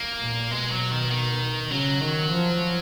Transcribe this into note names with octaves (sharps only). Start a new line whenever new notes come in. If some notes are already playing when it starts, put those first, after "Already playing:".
Already playing: A#3
A#2
B2 G#3
F#3
D#3
D#3
C#3 F#3
D#3
F3